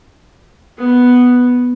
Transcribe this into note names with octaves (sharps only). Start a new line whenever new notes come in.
B3